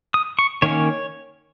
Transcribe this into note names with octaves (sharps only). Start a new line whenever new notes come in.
D#6
C#6
D#3 A#3 C#4 C#5